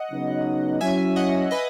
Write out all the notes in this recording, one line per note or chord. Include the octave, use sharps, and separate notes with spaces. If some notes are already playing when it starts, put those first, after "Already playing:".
Already playing: D#5 F#5
C#3 F#3 B3 D#4
F#3 C#4 E4 E5 G#5
D#5 F#5
B4 D#5